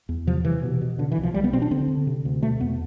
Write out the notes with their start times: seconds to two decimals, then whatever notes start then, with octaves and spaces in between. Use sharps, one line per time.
0.09 E2
0.27 C3 F3
0.45 C3 E3
0.63 B2
0.82 B2
0.98 B2 D3
1.12 E3
1.18 C2
1.23 F3
1.34 C2 G3
1.44 B3
1.53 B2 C4
1.62 D4
1.71 D3 C4
1.88 D3
2.07 C3
2.25 D2
2.42 B2 A3
2.61 E2 B3